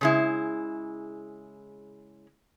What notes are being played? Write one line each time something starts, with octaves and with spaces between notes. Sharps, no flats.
C#3 G#3 E4